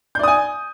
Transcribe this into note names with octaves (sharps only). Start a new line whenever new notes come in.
D5 G#5 D#6 G6